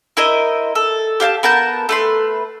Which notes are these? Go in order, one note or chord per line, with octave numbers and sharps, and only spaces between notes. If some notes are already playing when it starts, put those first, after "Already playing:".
E4 A#4 C5 D#5
A4
G4 F5 G5 A5
B3 A#4 A5 G6
A3 B4 C6